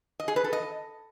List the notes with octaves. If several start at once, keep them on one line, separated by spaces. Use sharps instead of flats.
D#5
G#4
B4
A4
D#5